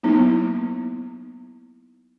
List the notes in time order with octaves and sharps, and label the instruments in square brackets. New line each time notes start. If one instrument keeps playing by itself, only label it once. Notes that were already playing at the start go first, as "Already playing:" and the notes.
[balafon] F#3 A#3 B3 D#4 E4